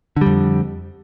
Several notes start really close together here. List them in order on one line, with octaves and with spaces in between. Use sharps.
D3 G3 F2